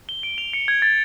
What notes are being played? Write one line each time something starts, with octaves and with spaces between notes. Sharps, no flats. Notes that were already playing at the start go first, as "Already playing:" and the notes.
G7
D7
F7
C#7
G#6
A6